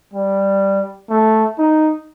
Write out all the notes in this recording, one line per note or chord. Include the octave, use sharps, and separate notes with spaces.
G3
A3
D#4